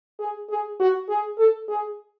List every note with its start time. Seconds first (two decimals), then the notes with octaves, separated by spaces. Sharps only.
0.19 G#4
0.50 G#4
0.80 F#4
1.09 G#4
1.38 A4
1.69 G#4